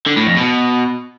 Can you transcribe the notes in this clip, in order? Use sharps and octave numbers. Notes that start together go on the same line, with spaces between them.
D3
A2
F2
B2